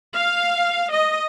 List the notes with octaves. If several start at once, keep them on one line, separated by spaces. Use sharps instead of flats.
F5
D#5